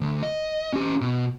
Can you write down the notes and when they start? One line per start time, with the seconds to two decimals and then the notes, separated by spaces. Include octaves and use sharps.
0.01 D3 A3
0.23 D#5
0.73 C#4 G4
1.01 B2